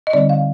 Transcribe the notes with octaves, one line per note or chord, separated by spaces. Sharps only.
D#5
D3 G3 C4 D#4 D5
F5